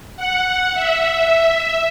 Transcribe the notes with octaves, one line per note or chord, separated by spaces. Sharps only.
F#5
E5